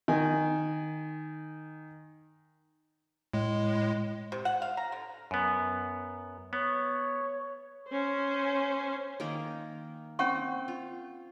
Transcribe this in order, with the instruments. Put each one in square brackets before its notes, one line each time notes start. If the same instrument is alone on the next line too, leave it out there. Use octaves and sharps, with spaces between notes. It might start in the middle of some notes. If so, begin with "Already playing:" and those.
[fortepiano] D#3 G#5
[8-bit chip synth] A2 G#3
[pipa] C3
F#5
F5
A#5
D3
[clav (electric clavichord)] F#2 B3
[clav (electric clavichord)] B3 [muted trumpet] C#5
[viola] C#4 C5
[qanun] D#3 A#3 A#4
[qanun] C4 [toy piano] C#4 F#5 C#6
[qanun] F4